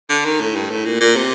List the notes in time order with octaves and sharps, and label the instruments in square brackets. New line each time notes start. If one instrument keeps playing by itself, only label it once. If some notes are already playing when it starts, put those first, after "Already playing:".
[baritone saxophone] D3
D#3
A2
G2
A2
A#2
A#2
C3